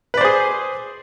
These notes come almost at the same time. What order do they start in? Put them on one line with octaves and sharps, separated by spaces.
B4 D5 C5 G#4